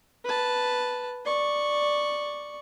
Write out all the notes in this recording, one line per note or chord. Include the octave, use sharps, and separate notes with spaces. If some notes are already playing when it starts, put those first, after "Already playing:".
B4 A5
D5 C#6